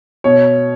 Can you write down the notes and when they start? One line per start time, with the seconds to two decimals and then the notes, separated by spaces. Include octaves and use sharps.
0.24 B2 C#5